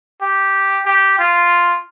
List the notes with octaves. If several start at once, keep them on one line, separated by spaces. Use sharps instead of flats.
G4
G4
F4